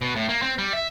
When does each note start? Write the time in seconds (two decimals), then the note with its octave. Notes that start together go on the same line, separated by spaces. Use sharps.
0.02 B2
0.16 A2
0.29 A#3
0.42 C4
0.58 G3
0.73 E5